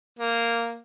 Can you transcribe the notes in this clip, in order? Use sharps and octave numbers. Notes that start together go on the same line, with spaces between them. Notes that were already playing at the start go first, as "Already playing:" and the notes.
A#3